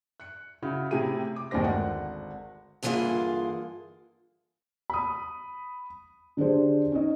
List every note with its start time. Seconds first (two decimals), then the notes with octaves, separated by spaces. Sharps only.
0.20 F#6 C#7
0.62 C#3 E4 F#4
0.91 A2 C3 E4 G4 G#4 D#7
1.36 D6
1.51 G1 D#2 A2 G#3 C5 A#6
1.64 G#1 D3 F#5
2.83 G2 D3 E3 A#3 F4 G#4
4.90 B5 D#6
6.37 D3 D4 G4 G#4 C5
6.92 C#4 D#4 D#5